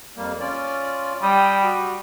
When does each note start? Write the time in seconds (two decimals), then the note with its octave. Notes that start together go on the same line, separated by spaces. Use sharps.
0.17 F2 G3 A#3
0.40 C#4 F4 D5
1.22 G3 G5 D#6
1.62 F#4